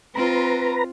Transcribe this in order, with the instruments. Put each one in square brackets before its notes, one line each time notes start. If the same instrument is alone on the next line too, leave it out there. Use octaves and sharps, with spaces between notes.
[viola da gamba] C4 F4 [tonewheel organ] B4 A#5